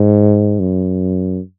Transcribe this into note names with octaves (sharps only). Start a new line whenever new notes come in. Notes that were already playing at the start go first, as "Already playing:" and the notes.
Already playing: G#2
F#2